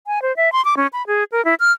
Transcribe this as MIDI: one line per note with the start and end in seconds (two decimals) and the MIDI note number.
0.07 0.22 80
0.22 0.35 72
0.37 0.52 76
0.52 0.64 84
0.65 0.75 86
0.77 0.87 61
0.93 1.06 83
1.07 1.24 68
1.32 1.44 70
1.45 1.54 64
1.60 1.72 89